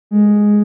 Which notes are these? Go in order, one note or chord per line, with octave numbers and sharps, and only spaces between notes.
G#3